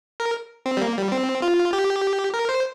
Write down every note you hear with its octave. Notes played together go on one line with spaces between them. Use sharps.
A#4
C4
G3
A#3
G3
C4
F4
G4
A#4
C5